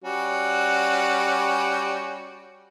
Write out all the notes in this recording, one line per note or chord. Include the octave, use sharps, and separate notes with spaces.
G3 C#4 F#4